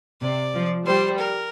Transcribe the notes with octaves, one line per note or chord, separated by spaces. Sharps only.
C3 D5
F3
G3 C5
A#4